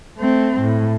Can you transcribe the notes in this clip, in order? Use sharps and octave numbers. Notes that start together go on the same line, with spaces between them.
A3 C4
A2